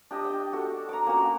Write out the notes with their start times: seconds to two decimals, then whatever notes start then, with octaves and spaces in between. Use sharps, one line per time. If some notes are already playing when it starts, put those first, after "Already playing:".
0.11 D4 G4 D#5
0.25 G5
0.53 F#4 A4
0.89 A#5 D6
1.06 A#3 C#4 F#4